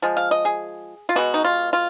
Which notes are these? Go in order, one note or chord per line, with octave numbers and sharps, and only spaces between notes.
F3 G#3
F5
D#5
G#4
F4
B2 G#3 B3 F#4
D#4
F4
F4